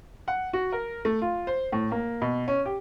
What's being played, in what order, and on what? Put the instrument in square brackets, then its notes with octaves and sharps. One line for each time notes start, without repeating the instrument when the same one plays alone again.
[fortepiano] F#5
F#4
A#4
A3
F4
C5
A2
A#3
B2
C#4
G4